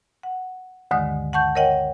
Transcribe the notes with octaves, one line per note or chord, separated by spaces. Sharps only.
F#5
D2 G2 D3 D#3 G#3 D#6
F#5 A5 C#6 G6
A#4 C#5 D#5 F#5 G5